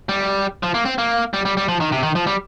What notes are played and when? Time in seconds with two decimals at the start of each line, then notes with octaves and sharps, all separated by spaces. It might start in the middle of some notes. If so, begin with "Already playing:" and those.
0.09 G3
0.63 F3
0.74 A#3
0.85 C4
0.98 A#3
1.34 G3
1.45 G3
1.57 G3
1.68 F3
1.80 D#3
1.92 C3
2.03 D#3
2.15 F3
2.27 G3